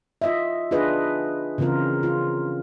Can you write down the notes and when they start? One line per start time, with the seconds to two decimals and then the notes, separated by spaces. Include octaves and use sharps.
0.22 F4 D#5 E5
0.71 D4 F4 G#4 B4 D#5
1.58 C#3 E3 C4 F4 A#4
2.03 F4